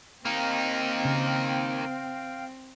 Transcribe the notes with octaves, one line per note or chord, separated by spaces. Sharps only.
A#3 C4 D#4 F5 G5
C#3